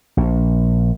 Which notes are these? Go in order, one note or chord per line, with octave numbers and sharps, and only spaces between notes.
A#1